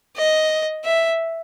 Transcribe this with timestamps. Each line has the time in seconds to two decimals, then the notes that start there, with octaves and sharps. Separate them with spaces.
0.17 D#5
0.85 E5